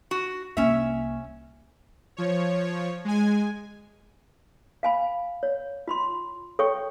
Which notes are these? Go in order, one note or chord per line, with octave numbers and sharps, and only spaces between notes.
F#4
C2 A#3 C#4 E5
F3 C#5
G#3 G#5
F5 G#5 B5
C#5
F4 B5 C6
A4 C#5 G5 C#6